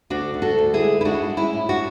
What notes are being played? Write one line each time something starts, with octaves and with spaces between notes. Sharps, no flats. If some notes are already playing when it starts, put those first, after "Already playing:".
D2 D4 F#4
D2
F#4 A4
D2
E4 G#4
G#3
E4
G#3 D4 F#4
G#3
C#4 E4
A2
D4 F#4